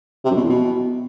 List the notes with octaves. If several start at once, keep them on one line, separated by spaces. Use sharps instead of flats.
C3
F#2
B2
E2
B2